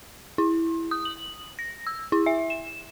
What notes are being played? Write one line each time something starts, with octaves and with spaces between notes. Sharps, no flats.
E4
D#6
F#7
A#6
E6
E4
E5
E7